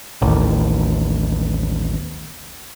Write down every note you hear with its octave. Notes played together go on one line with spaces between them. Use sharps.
A1 D#2